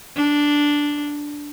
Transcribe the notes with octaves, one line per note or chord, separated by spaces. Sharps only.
D4